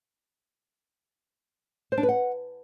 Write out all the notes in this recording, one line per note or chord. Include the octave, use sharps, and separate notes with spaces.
C5
D4
B4
F#5